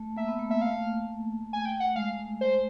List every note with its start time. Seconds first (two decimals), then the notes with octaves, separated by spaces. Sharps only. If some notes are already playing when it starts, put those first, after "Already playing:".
Already playing: A3
0.17 A#3 E5
0.28 B3
0.39 A3
0.50 A#3 E5
0.62 A3 F5
1.53 G#5
1.65 G5
1.80 F#5
1.96 G#3 F5
2.41 C5